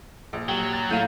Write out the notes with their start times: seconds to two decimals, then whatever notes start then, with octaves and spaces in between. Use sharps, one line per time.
0.33 A#1
0.48 F#3 G4
0.73 A6
0.91 A2 F5 G6 D#7